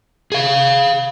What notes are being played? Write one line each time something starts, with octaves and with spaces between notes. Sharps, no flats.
G#4 F5